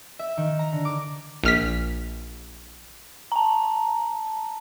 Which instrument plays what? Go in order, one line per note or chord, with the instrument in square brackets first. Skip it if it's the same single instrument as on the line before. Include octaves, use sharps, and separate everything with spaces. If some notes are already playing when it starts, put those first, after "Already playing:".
[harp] E5
D#3
A#5
D3
D6
[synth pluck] A#1 F6 B6
[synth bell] A5 A#5